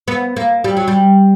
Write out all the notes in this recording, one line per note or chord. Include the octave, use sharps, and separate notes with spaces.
B3
A#3
G3
F#3
G3